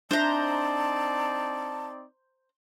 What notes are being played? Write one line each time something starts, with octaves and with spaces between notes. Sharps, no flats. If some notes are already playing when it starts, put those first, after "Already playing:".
C4 D4 D#4 C5 D5 E5 A5 A#5